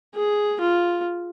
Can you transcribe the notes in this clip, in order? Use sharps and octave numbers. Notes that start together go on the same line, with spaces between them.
G#4
F4